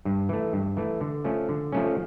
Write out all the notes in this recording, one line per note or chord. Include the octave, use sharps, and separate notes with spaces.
G2
E3 A3
G2
E3 A3
D3
F3 A3 C#4
D3
F3 A3 C#4